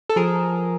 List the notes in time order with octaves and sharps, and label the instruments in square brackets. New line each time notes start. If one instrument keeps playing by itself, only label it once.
[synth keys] A4
F3 G#4 A#4